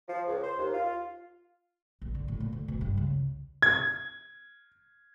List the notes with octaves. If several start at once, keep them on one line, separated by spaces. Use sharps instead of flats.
F3
C#2
C5
D#2
F4
A#1
D3
A2
A#2
D2
B2
G2
C#2
G#6